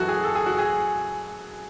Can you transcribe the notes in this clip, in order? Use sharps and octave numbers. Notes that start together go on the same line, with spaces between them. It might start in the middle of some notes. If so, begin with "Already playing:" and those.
Already playing: F#1 F#2 E3 F#4 A4
G#4
A4
G#4
F#4
G#4